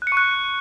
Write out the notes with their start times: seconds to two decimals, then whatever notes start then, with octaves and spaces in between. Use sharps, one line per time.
0.02 F#6
0.07 C#7
0.12 C#6
0.17 F#6